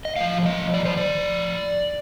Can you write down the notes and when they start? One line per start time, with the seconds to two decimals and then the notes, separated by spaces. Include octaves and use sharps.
0.05 D#5
0.16 A2 F3 F5
0.46 D#5
0.74 D5
0.85 C5
0.97 D5